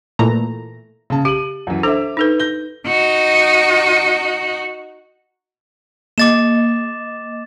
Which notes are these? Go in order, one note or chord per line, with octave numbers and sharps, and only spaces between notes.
A#2 E3 A3 A#5
C#3 A5
G4 D#7 F#7
F#2 E3
D4 A4 C5 E5 D6
D#4 A4 B4
G6 A#6 G7
D#4 F#4
A#3 D#5 D6 A6 E7